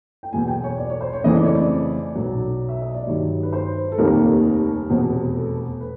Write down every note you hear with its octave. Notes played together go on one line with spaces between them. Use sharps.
G5
E2 B2 F#3 B3 G#5
G5
C#5
D5
C#5
C5
C#5
F2 C#3 E3 A3 C4 D#5
D5
C#5
D5
B1 B2 F#3
E5
D#5
D5
G2 D#3 F#3 C#5
B4
C5
A4
F1 D#2 D#3 G3 A#3 A#4
F1 E2 B2
A4
B4